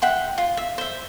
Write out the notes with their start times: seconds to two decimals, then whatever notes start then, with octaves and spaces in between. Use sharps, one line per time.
0.02 E5 F#5 G5 C6
0.38 F4
0.57 E5
0.78 C5 E5